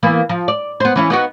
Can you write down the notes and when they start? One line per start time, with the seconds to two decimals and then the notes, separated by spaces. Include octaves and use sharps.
0.03 E3 A#3 B3
0.29 F3
0.48 D5
0.80 B3 C5
0.96 E3 C#4 E4
1.10 B3 D#4 F#4